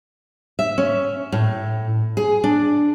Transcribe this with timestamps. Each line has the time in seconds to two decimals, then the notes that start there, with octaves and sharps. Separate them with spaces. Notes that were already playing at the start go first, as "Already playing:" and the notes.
0.59 E5
0.78 C#4
1.32 A2
2.17 G#4
2.44 D4